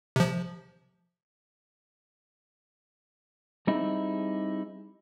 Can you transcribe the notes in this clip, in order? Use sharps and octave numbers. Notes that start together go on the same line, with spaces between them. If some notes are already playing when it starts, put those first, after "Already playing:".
C3 F3
G3 C4 D#4 E4 G#4